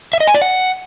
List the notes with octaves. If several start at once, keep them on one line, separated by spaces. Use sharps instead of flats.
E5
D#5
G#5
D5
F#5